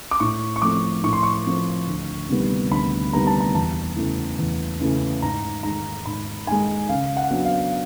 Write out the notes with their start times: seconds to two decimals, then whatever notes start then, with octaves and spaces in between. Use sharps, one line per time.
0.11 D6
0.20 A2 C#6
0.56 C#6
0.62 F3 A3 C4 D6
1.03 A2 C#6
1.13 C6
1.23 C#6
1.46 F3 A3 C4
1.88 D2
2.29 C3 D#3 G3 B3
2.71 D2 B5
3.13 C3 D#3 G3 B3 A#5
3.27 A5
3.40 A#5
3.54 E2 A5
3.96 C#3 E3 A3
4.39 E2
4.80 C#3 E3 A3
5.22 G#2 A#5
5.63 D#3 G#3 A#5
6.06 G#2 B5
6.47 D#3 G#3 G#5
6.89 C#3 F5
7.17 F#5
7.31 F#3 B3 D4
7.45 F5